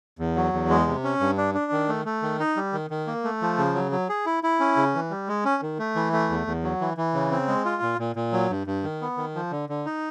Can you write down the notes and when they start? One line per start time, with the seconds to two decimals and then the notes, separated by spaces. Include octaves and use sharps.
0.19 E2
0.36 F#3
0.53 E2
0.70 G#3
0.87 C3
1.04 C#4
1.20 G2
1.38 D4
1.55 D4
1.72 D#3
1.89 A3
2.05 A3
2.22 D#3
2.40 D#4
2.57 G3
2.73 D#3
2.90 D#3
3.07 A#3
3.24 A3
3.42 F3
3.58 C#3
3.75 F#3
3.92 F#3
4.09 G#4
4.26 E4
4.44 E4
4.60 C#4
4.76 C#3
4.94 E3
5.10 G3
5.28 G#3
5.45 C#4
5.62 D#3
5.79 A3
5.95 E3
6.13 A3
6.30 E2
6.47 E2
6.63 F#3
6.81 E3
6.97 E3
7.14 C#3
7.31 C4
7.48 G#3
7.65 F4
7.82 A#2
7.99 A#2
8.16 A#2
8.33 F#3
8.50 G2
8.67 G2
8.83 D#3
9.01 B3
9.17 D#3
9.35 F3
9.51 D3
9.69 D3
9.86 D#4